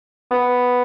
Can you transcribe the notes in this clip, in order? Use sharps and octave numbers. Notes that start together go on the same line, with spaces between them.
B3